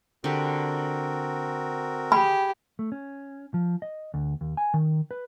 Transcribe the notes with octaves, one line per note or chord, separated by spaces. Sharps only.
D3 C4 F#4 G4 A#4
G4 G#4 B5
A3
C#4
F3
D#5
D2
D#2
G#5
D#3
B4